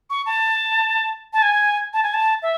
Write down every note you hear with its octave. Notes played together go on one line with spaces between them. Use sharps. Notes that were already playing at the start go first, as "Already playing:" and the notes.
C#6
A5
A5
G#5
A5
G#5
A5
E5